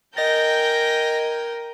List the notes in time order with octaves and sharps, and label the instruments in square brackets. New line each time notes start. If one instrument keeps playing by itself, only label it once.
[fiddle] A#4 [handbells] D#5 A6 [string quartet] G5 G#5 G6 [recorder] A#6